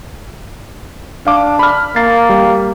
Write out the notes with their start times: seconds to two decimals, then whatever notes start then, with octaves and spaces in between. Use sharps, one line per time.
1.27 D4 F5 D6
1.59 B5 F6
1.96 A#3 A6 C7
2.29 G3